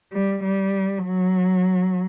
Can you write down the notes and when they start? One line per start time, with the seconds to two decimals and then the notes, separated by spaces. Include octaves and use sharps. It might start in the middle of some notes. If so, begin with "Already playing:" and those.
0.13 G3
0.43 G3
1.04 F#3